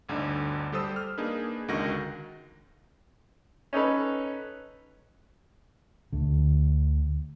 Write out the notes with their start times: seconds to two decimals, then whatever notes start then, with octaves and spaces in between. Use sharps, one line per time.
0.09 G1 D2 D3 D#4
0.72 G3 G4 A4 C5 D#6 E6
0.96 F6
1.18 A#3 D4 D#4 G#4 B4
1.68 C#2 D3 D#3 F#4 A#6
3.73 C#4 D#4 A4 B4
6.12 D2 D3